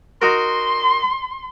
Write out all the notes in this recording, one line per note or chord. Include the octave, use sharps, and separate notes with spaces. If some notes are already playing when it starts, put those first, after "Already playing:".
D#4 F#4 A#4 C6